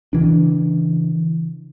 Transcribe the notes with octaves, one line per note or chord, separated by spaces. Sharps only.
C#3 E3 D4